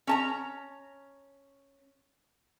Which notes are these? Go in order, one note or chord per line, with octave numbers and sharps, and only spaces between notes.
C#4 A5 A#5